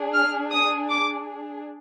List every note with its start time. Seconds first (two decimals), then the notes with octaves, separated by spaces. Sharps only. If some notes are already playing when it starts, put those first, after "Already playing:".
Already playing: D4 G#4
0.14 F6
0.52 D#6
0.90 D6